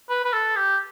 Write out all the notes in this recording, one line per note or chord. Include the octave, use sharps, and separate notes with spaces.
B4
B4
A4
G4